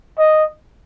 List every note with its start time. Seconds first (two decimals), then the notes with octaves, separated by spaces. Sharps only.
0.18 D#5